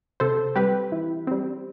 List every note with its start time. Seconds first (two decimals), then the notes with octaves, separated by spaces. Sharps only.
0.20 C3 A4 C5
0.55 G3 C4 G4 B4
0.92 E3
1.27 G3 C4